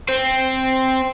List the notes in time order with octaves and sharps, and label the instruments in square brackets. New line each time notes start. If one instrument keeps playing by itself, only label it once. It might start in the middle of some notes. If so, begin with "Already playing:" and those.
[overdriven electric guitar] C4